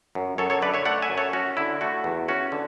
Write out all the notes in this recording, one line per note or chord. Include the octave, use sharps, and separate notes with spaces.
F#2
F#2 A4 C#5
A4 C#5
D3 B4 D5
C#5 E5
A3 D5 F#5
E5 G#5
F#2
A4 C#5
C#4 F#4
D3 E4
A3 F#4
E2
C#4 F#4
D3